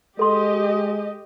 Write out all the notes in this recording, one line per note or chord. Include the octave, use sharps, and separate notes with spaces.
G#3 G4 A4 D#5 C6